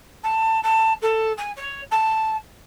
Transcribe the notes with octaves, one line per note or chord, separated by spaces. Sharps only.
A5
A5
A4
G#5
C#5
A5